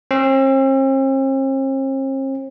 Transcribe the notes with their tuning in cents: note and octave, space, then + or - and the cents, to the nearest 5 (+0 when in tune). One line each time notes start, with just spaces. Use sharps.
C4 +45